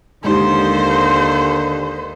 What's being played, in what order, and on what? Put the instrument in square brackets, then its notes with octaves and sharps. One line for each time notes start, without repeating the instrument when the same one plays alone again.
[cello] D#2 D#3 [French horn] D3 [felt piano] G#3 D#4 G4 [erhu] C5